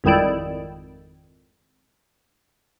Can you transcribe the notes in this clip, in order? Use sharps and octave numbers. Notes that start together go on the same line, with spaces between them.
G#1 F2 D#3 G3 E4 D5